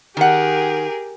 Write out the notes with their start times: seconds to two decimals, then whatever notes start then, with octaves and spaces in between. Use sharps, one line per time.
0.17 D#3 G4 G#4 A#4 F#5